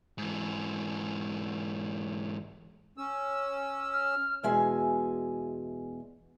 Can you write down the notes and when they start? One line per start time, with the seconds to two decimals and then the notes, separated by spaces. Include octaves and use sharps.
0.18 G#2 E3
2.98 C#4 E6
3.92 F6
4.43 E2 B2 G#3 E5 G#5